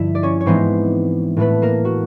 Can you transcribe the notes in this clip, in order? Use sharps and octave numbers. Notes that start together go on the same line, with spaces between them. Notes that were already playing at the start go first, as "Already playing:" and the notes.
Already playing: G2 D3 F3 E4 E5
D5
C#4 C#5
C#5
G#2 E3 G#3 B3 C4 D#4 C5
A2 E3 A3 B3 B4
A#3 A#4
F#4